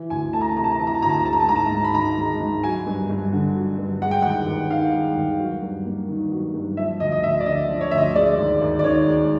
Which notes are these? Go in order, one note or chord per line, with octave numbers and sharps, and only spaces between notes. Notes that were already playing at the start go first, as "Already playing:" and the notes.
Already playing: E3
D2 G#5
A3 A5
A#5
A5
C3 A#5
A5
A#5
E3 A5
A#5
A5
D2 A#5
A5
A#5
G#3 A5
A#5
A5
G#2 A#5
A5
G#2
B5
D#3 A#5
G#3
G#2
F#3 G#5
G2
G2
D3
F#3
G2
G#3 F#5
G5
D#2 F#5
D#2
D#3 F5
G#3
D#2
F#3
G2
A#3
D#3
F#3
G2
F3 E5
D2 D#5
D#5
D2 E5
D5
D3 D#5
F3
C#5
D2 E5
D#5
G#3 D5
D#2
D#2
D5
D#3 C#5
G#3